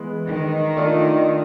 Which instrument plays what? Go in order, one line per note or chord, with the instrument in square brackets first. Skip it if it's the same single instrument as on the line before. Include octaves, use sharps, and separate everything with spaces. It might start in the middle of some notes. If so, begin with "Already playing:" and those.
Already playing: [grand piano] E3 G#3 B3
[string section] D#3
[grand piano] A3 D4 F4 A4 D5